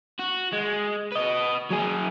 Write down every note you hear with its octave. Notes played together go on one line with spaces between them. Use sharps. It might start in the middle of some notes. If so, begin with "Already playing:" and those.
F#4
G#3
B4 D#5
F#3 G#4